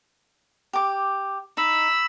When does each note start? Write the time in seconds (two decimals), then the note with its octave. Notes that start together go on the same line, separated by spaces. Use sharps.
0.73 G4 D6
1.57 D#4 B5 E6